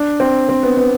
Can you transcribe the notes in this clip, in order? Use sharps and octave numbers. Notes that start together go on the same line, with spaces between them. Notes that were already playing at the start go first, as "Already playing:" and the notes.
Already playing: D4
C4
C4
B3
B3